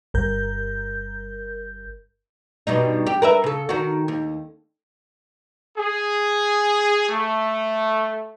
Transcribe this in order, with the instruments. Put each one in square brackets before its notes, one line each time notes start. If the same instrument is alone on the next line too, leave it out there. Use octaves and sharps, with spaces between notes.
[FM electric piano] G1 G2 A#4 G6
[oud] G2 B2 D#4
G4
A#4 B4 E5
C#3 A4
D#3 F#4
D#2
[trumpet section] G#4
A3